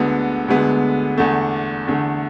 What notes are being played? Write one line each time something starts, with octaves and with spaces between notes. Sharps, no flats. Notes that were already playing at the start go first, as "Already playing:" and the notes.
Already playing: D2 D3 G#3 B3
D2 D3 G#3 B3
E2 D3 A3
E2 D3 A3